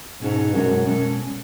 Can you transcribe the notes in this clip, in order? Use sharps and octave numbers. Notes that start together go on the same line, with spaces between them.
G#2 B2 G#3 C#4 F#4 A4
F#2 B2 G#3 C#4 F#4 A4
B2 G#3 C#4 F#4 A4